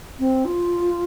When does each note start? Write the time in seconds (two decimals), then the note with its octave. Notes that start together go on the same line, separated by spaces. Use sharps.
0.19 C4
0.45 F4